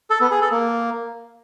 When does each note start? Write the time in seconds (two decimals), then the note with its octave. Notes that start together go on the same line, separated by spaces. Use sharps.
0.10 A4
0.21 B3
0.31 G#4
0.41 A4
0.52 A#3